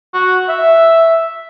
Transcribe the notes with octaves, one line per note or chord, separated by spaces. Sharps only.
F#4
E5